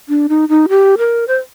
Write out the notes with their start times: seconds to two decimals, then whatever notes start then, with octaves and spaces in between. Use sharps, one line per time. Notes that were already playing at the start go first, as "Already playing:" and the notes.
0.09 D4
0.29 D#4
0.49 D#4
0.69 G4
0.98 A#4
1.28 C5